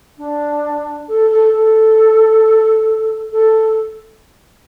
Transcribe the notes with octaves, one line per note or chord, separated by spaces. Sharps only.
D4
A4
A4
A4
A4